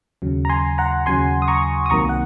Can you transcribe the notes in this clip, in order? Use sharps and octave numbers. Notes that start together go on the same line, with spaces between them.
D#2 C#3 F#3
A#5
G#5 C6
F#5 A#5
D#2 C#3 F#3 G#5 C6
D#6
A#5 C#6
D#6
C2 C3 D#3 F#3 A#3 A#5 C#6
F#5